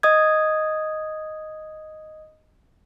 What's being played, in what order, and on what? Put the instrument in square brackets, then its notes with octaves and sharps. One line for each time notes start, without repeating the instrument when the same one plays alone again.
[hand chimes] D#5 D#6 G#6